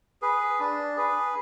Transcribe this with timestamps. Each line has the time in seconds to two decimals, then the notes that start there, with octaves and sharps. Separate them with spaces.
0.22 G#4 B4
0.60 D4
0.97 G#4 B4